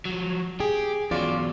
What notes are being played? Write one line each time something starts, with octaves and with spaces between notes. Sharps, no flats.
F3 F#3
G4 G#4
E2 F#3 C#4 F4 D5